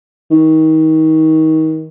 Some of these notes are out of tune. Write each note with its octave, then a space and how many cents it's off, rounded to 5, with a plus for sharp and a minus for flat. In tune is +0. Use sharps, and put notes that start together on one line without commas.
D#3 +30